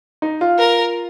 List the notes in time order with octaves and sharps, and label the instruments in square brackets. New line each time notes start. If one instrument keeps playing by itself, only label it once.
[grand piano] D#4
F4
[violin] A#4